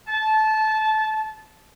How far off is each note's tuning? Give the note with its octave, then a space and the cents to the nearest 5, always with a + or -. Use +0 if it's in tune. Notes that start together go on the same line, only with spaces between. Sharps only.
A5 -20